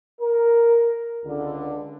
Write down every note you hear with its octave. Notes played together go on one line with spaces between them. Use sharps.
A#4
C#2 D3